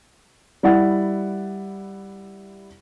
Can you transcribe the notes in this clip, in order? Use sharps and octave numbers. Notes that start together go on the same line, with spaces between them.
G3 E4 F#5 A6